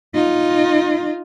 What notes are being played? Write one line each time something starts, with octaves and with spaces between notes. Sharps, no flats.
D#4 F4